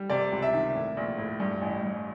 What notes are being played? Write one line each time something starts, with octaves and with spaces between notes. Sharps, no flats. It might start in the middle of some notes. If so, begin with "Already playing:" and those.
Already playing: G3
C3 D5
C#2
E5
D#3
A2
A#1
A2
G2
A1
G2